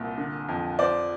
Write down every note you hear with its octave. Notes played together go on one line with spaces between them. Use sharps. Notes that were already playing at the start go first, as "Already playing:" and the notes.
Already playing: C2 A#2
D3
F2
F3 C5 D5